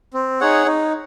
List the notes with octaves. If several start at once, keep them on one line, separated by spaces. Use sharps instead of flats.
C4
D#4 G#4 C#5 F#5
D#4